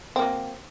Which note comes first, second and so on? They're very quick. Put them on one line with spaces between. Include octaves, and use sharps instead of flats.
C4 A#3 F#3